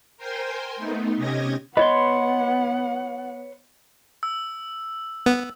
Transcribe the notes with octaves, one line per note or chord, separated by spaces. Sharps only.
A#4 C5 G5 G#5 C6
A3 B3 D#4
C3 C#4 G4 D#5 G#6 A#6
B3 B4 C#5 D#5 F#5 C6
E6
B3